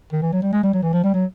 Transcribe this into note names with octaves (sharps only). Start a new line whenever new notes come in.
D#3
E3
F#3
G3
G#3
G3
F#3
E3
F3
G3
F#3